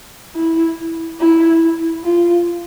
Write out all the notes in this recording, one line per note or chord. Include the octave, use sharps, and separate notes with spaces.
E4
E4
F4